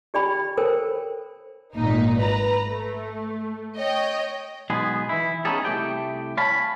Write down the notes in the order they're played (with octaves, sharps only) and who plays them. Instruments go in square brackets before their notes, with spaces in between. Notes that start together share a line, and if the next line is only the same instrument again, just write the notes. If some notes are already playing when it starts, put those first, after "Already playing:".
[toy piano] G4 D5 G5 B5
A4 A#4 C5 C#5 G5
[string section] G#1 A#2 D#4
B4 A#5
A3
C#5 D#5 G5
[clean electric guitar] B1 G#3 B3 G#4
E3 E4
B3 C#4 D#4 G#4 A4
C2 A3 G4 G5
C#5 F5 G#5 A5 B5